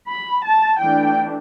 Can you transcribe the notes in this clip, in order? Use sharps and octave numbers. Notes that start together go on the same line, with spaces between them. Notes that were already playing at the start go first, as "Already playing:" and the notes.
B5
A5
E3 A3 D4 G5